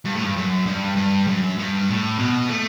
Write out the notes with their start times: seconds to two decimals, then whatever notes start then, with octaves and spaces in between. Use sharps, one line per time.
0.05 G2
0.14 A2
0.24 G2
0.36 F#2
0.66 G2
0.97 G2
1.27 F#2
1.58 G2
1.88 A2
2.19 B2
2.49 A3